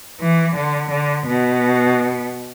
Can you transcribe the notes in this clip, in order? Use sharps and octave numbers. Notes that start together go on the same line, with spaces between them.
E3
D3
D3
B2